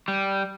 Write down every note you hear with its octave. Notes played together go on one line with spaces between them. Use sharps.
G3